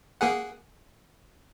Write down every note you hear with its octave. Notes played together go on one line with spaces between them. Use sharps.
A#3 G#4 F#5